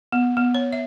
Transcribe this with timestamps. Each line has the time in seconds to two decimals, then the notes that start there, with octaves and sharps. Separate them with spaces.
0.12 B3
0.37 B3
0.55 C#5
0.73 E5